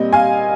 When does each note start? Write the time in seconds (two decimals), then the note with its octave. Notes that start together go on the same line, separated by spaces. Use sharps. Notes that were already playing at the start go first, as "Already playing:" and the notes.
Already playing: A#2 G3 C4 D#5
0.13 F5 G#5